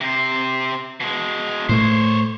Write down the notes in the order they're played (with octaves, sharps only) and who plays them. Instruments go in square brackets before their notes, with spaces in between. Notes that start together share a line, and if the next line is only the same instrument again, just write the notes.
[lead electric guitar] C3 C5
B2 G#3
[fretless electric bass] A2 A3 [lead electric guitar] C5 C#5